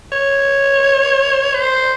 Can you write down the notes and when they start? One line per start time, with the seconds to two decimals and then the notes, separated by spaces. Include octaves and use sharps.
0.12 C#5
1.55 C5